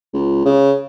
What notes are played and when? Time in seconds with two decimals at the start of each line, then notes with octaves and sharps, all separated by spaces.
0.13 C#2
0.45 C#3